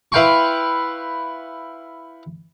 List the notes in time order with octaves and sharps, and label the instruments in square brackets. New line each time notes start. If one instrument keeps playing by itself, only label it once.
[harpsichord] E4 B4 F5 G5 C6 C#6